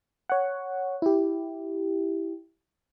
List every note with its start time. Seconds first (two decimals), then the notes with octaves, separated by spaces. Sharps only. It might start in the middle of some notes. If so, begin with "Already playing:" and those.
0.30 C#5 F#5
1.02 E4 G4